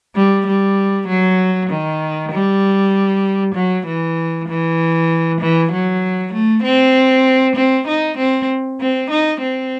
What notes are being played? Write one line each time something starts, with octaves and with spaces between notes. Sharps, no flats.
G3
G3
F#3
D#3
G3
F#3
E3
E3
E3
F#3
A3
C4
C4
D#4
C4
C4
D#4
C4